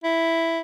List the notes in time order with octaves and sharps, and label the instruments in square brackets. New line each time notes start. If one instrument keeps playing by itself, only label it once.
[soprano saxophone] E4